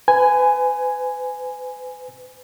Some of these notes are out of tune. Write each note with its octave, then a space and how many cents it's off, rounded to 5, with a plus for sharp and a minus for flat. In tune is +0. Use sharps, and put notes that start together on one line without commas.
B4 +35 G#5 +0